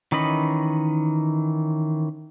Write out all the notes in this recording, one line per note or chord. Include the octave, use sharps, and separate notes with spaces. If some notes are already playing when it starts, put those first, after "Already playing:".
D#3 E3 C#4 D#5 B5